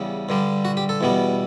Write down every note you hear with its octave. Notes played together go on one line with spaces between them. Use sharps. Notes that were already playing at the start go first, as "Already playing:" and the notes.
Already playing: E2 C#3 G3 B3
G2 D3 G3
F#4
G4
A4
E2 B2 G3 B3